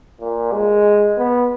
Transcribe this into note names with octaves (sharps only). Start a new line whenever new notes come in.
A#2
G#3
B3